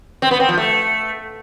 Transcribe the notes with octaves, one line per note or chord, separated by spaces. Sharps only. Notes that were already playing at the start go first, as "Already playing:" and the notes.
C4
B3
C4
F3
A3